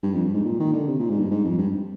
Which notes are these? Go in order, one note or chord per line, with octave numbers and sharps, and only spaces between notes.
G2
F2
G2
G#2
A#2
D#3
D3
C3
A#2
G#2
G2
G#2
F2
G2